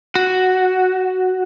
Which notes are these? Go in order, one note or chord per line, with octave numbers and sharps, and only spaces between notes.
F#4